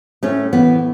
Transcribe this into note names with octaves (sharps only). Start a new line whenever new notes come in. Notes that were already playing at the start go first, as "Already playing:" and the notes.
A2 A3 C#4
E3 B3